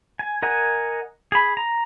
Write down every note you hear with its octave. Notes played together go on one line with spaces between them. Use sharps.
G#5
A#4 D#5 F#5 G#5
G#4 B5
A#5